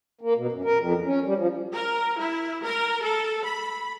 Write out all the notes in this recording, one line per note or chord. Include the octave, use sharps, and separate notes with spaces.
A#3
B2
F#2
A#4
F2
E2
C#4
G3
F3
A#4
E4
A#4
A4
B5